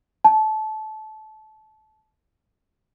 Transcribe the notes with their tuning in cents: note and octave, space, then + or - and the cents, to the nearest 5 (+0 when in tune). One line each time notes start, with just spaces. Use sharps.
A5 -20